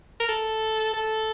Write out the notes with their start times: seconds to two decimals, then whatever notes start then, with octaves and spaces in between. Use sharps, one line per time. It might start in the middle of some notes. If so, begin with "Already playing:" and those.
0.20 A#4
0.29 A4
0.94 A4